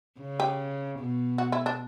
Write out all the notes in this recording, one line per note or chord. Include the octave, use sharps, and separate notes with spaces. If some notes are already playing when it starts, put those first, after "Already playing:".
C#3
G4
B2
F#4
E4
D4